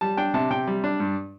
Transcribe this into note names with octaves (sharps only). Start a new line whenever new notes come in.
G3 A5
D4 G5
C3 A5
C3 G5
G3
D4
G2